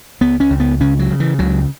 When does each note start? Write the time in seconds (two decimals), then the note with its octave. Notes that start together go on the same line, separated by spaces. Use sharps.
0.21 C#2 B3
0.40 C#4
0.50 C#2
0.60 B3
0.81 C#3 C#4
0.99 F#3
1.10 C#3
1.20 E3
1.39 C#2 F#3